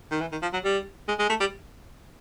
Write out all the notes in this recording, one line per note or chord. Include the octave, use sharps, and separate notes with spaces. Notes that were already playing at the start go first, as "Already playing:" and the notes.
D#3
E3
D#3
F3
F#3
G3
G#3
G#3
A3
G3